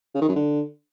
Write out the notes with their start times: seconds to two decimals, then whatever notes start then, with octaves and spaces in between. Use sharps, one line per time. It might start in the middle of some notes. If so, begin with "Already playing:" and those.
0.15 C#3
0.22 D#3
0.29 F#2
0.36 D3